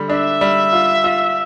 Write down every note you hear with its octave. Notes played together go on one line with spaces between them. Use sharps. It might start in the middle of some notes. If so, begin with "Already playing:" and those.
Already playing: D3 G3
D4 E5
G3
F4
F4